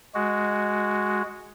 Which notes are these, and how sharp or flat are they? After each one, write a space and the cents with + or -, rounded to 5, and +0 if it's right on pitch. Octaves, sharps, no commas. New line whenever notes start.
G#3 +0 F#4 +0